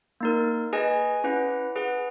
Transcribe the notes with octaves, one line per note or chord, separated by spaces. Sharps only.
A#3 D#4 A#4
G#4 B4 D#5 G#5
C#4 E4 B4 F#5
G#4 B4 F#5